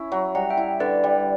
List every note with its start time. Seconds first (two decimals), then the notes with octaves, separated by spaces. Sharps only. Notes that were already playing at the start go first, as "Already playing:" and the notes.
Already playing: C#4 E4
0.12 F#3
0.35 G3 F#5 A#5
0.50 E5 G5
0.57 E4
0.80 D3 B4 D5
1.04 G3